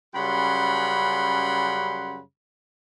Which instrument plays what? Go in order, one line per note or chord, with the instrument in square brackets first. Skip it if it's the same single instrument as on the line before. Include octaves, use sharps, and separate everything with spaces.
[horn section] F#2 C#3 G3 F#5 B5 C6